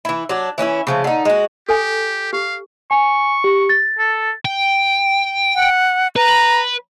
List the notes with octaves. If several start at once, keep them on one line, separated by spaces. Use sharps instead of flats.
E3 E4
F#3 D4
E3 C#4 D#4 E4
C#3 F3 A3
D3 D#4
G#3 F#4
G4 A4 G#5
G4 F5
G#5 C#6
G4
A6
A4
G5
F#5
B4 A#5